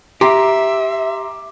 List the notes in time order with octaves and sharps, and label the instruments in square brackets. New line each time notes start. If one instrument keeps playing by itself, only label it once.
[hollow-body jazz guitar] G4 [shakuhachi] E5 [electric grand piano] A#5 C6 D6